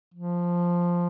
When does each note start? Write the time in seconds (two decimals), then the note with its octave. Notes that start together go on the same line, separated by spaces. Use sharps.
0.14 F3